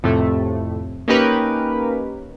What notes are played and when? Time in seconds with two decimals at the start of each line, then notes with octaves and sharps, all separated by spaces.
0.03 F2 A2 C3 A3
1.08 A#3 C#4 D#4 G4 A#4 B4